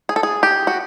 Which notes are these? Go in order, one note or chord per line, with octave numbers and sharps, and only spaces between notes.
G#4
A4
G#4
G4
F#4